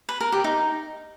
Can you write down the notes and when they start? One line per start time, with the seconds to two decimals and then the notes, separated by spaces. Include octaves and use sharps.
0.09 B4
0.21 A#4
0.32 G4
0.44 D#4